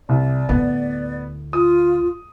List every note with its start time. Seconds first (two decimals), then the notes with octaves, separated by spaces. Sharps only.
0.09 C2 D5
0.49 D2 A2 B3
1.53 F4 D#6